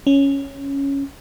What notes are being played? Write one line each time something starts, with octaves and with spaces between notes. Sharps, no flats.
C#4